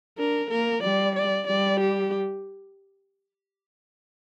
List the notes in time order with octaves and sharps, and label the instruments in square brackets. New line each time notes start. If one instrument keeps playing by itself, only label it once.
[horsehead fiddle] D4 [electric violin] A#4
[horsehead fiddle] A#3 [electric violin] A#4
[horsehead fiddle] G3 [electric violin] D5
[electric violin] D5
[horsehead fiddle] G3 [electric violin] D5
[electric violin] G4